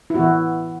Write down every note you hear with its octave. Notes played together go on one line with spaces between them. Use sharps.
E4
E3 B3 F#4